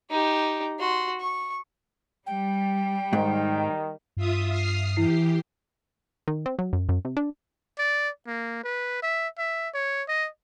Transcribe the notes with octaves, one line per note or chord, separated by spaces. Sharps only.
D#4 G4
F#4 C6
C#6
G3 G5
G#2 D#3
G2 F4 E5 D#6
D#6 F6 C7
E3 E4 G4 C7
D#3
C4
F#3
F#2
F#2
C3
D4
D5
A#3
B4
E5
E5
C#5
D#5